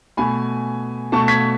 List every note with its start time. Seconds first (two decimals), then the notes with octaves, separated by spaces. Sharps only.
0.17 B2 A3 G#5 B5
1.12 B2 A3 A5 C#6
1.28 G#6 B6